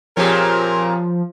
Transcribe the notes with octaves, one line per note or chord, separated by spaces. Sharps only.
A#2 F3 C4 G4 G#4 A#4 C#5